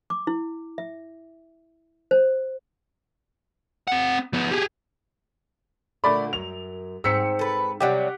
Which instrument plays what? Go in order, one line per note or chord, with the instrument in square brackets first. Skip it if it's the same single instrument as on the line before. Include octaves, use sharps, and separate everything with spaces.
[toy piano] D6
E4
E5
C5
[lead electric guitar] C4 F#5
F3 B3
G4 G#4
[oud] A#2 D3 [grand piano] A3 D5 B5
[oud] F#2 [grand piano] F7
[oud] G#2 C4 [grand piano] E6 B6 C#7
[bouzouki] A4 B4
[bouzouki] C3 F#3 G3 [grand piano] G4 F#5